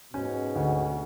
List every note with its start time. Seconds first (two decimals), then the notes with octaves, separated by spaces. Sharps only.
0.14 G#2 B2 C#4
0.56 D2